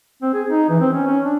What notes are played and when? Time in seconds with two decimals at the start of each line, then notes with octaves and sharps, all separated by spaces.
0.22 C4
0.34 G#4
0.49 D#4
0.69 E3
0.81 C4
0.93 C#4
1.07 C#4
1.25 D4